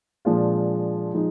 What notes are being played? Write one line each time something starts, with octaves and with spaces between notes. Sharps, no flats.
A#2 F3 G#3 D4 F4
F3 G#3 D#4